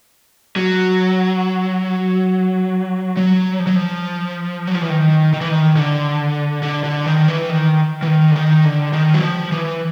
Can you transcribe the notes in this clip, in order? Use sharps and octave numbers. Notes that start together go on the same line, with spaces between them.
F#3
F#3
F3
F#3
F3
F#3
F3
E3
D#3
D#3
E3
D#3
D3
D3
D3
D#3
E3
D#3
E3
D#3
D3
D#3
D3
D#3
F#3
F3
E3